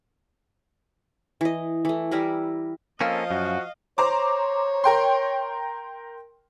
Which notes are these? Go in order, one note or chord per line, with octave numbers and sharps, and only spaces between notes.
E3 D#5
E3 A3
G3 E4 A#4 B4
F3 A#3 C4 C#4 A4 D#5 F5
F#2 F#4
C5 C#5 A#5 D6
A#4 G5 C6